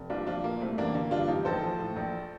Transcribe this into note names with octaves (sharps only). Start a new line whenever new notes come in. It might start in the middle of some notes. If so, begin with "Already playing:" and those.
Already playing: F1
C2 D4 F4
F3 D4 F4
A#2 A#3
C2 A3 C4
A1 A#3 D4
D3 A#3
G2 D4 F4
A1 D#4 G4
A#1 A4 C5
F3
A2
A#1